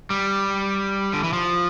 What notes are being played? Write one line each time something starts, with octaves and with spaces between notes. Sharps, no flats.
G3
D3
E3
F3